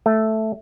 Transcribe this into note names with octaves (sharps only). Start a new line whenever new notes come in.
A3